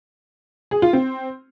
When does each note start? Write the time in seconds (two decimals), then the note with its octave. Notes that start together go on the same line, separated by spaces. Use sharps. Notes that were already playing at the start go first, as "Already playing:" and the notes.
0.71 G#4
0.82 F4
0.93 C4